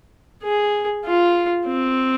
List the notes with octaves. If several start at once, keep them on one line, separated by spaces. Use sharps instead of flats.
G#4
F4
C4